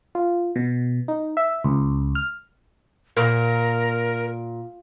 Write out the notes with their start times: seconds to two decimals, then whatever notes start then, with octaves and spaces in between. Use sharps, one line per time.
0.15 F4
0.56 B2
1.08 D#4
1.37 E5
1.64 C#2
2.15 F6
3.17 A#2 A#4